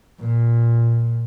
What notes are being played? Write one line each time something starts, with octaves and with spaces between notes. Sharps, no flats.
A#2